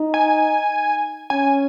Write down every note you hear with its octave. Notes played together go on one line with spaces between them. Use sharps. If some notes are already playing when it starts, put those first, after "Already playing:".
Already playing: D#4
G#5
C#4 G#5